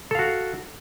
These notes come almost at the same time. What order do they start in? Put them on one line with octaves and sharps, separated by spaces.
A4 F5 F#4